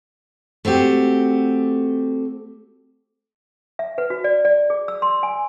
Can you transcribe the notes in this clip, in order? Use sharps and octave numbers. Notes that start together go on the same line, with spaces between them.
A3 C4 F#4 G4
E5
B4
F#4
D5
D5
G#4
E6
C6
G#5